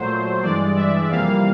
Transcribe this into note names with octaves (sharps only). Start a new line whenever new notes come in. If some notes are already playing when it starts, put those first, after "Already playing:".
Already playing: A#2 F#3 A3 C5
G2 E3 G#3 D5
E5
F2 C3 E3 G3 A#3 F5